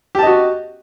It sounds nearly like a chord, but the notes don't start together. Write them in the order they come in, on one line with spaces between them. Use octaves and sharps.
G4 A5 D#5 F#4